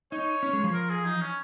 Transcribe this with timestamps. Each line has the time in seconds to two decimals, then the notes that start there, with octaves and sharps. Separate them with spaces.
0.12 D#4 C#5
0.43 C#4
0.53 G#3
0.64 F3
0.73 A#4
0.90 G#4
1.05 D#4
1.21 C#4